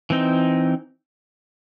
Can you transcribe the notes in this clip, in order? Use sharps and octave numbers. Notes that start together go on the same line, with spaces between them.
E3 C4 D#4